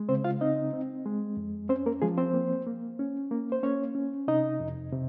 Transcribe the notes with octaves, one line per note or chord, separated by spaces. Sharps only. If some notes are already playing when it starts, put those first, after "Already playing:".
Already playing: G#3
C#3 C4 C5
F4 F5
C4 D#4 D#5
C4
G#3
F2
C4 C#4 C5
A#3 A#4
F3 G#3 G#4
C4 C5
A#3
A#3
C#4
A#3
C5
A#3 C#4 C#5
C#4
C3 D#4 D#5
F2
C3